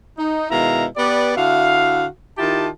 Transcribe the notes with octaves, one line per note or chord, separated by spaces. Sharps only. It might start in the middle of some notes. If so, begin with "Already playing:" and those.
D#4
B2 D#3 G#3 E4 F5 A#5
B3 G4 B4 D5
D3 E4 F#4 E5 F5
D#3 E4 F4 G4 A5